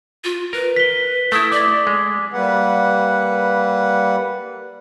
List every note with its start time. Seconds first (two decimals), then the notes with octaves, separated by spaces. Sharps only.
0.24 F4
0.53 A#4 B4
0.76 B6 G7
1.32 A3 E4 D#6
1.52 D5 D6
1.87 G#3
2.33 G3 A#3 B4 F#5